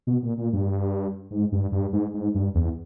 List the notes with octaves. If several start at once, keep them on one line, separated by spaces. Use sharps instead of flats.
B2
A#2
A#2
G2
G#2
G2
G2
G#2
G#2
G2
E2